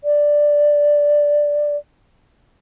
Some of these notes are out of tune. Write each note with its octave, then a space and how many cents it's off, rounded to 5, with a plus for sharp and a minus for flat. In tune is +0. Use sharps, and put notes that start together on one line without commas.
D5 +0